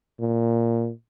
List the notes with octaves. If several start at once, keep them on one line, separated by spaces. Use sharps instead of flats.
A#2